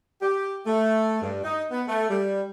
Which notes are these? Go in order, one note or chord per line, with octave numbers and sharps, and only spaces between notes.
G4
A3
G2
D#4
B3
A3
G3